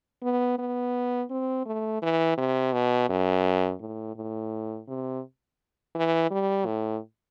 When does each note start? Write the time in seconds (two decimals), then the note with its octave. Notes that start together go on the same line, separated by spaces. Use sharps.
0.23 B3
0.59 B3
1.30 C4
1.66 A3
2.02 E3
2.38 C3
2.73 B2
3.09 F#2
3.80 A2
4.16 A2
4.88 C3
5.95 E3
6.31 G3
6.66 A2